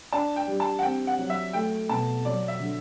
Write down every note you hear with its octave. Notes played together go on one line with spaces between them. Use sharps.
D4 A5
G5
G3
A5
F#5
C4 G5
F#5
F#3
E5
A3 G5
B2 A5
F#3 D5
E5
D3